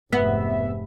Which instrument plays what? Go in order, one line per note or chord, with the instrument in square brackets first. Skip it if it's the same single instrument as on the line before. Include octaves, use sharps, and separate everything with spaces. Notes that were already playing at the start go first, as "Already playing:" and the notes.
[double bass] F1 G#2 [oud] B3 [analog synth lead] E5